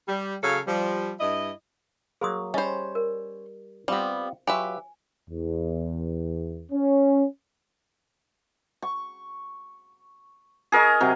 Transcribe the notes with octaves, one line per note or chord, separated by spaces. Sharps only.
G3
C#3 F#3 A4 C#5 F5
F3 G3
G2 E4 D#5
F#3 A#3 G#4 C6 D#6
G3 C#4 C5 D#5 B5
A#4
G3 B3 C4 F4 G4
F#3 F4 G4 B4 E5 G#5
E2
C#4
C#6
G#4 A#4 C#5 D#5
C3 F#3